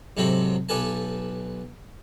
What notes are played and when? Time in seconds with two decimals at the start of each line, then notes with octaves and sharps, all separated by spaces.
0.17 G#2 C3 F#3 A4 G5 B5
0.69 B1 G4 A4 B4 G#5 A5